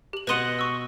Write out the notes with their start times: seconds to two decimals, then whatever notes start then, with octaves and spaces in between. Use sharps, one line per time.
0.13 G4 F#7
0.27 B2 B4 D#5 F#5 C6
0.59 C#6 E6